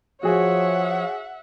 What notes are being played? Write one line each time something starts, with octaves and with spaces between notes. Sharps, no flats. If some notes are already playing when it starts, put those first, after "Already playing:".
F3 F#4 G#4 C#5 E5 F#5